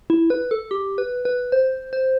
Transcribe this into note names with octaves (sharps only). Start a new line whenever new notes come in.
E4
B4
A4
G4
B4
B4
C5
C5